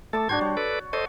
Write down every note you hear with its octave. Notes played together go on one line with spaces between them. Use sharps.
A3 A4 A5 D6
G#2 D4 F#4 C5 G#6
G3 C#5
A4 B4 D5
A4 C5 C#5 D#5